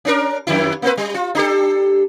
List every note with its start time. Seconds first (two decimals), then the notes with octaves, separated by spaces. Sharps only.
0.05 C#4 D4 A#4
0.47 F2 D#3 E4
0.82 A#3 C4 B4
0.97 G3
1.14 F4
1.35 D4 G4 A4